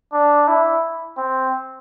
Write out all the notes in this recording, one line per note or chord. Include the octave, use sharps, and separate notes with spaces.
D4
E4
C4